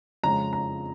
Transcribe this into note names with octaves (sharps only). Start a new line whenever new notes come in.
F2 C#3 F3 G#3 A#5
A#5